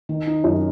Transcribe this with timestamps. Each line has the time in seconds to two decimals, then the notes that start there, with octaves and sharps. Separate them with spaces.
0.09 D#3
0.27 D#4
0.44 F#2